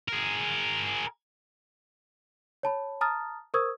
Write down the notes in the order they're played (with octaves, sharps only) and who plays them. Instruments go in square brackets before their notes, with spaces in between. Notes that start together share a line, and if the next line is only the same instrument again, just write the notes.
[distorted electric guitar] G#4 A#4
[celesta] C#5 A5 B5
A5 A#5 D#6 F6 A6
A#4 C5 C#6 D#6 E6 G#6